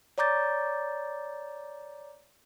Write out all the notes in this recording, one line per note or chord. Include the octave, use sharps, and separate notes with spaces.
C#5 D5 A#5 D6 G6 A6